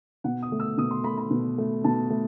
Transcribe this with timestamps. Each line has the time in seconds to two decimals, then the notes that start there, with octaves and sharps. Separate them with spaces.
0.24 B2 F#5
0.42 D#6
0.52 A3
0.60 E6
0.78 B2 D#6
0.91 C6
1.04 A3 B5
1.17 B5
1.31 B2
1.58 A3
1.84 B2 A5
2.10 A3